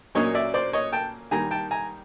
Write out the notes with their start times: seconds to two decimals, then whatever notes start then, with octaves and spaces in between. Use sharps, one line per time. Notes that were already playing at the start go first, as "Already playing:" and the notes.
0.15 A#2 F#3 A#3 C#4 C#5 D#5
0.35 D5 E5
0.54 C5 D5
0.73 C#5 D#5
0.92 G5 A5
1.31 D#3 G3 A#3 G#5 A#5
1.51 G5 A5
1.71 G#5 A#5